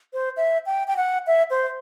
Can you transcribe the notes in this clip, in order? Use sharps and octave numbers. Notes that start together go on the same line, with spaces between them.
C5
E5
G5
G5
F#5
E5
C5